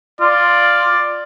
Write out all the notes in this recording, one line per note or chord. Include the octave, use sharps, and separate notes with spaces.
F4 D5